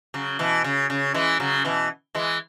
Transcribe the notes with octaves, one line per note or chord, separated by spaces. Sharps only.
C#3 F#3
B2 E3
C#3
C#3
E3 G#3
C#3 F#3
B2 E3
E3 G#3